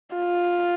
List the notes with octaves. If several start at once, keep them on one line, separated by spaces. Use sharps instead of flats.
F4